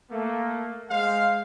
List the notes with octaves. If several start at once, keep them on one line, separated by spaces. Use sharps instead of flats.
A3 A#3
G#3 C5 F5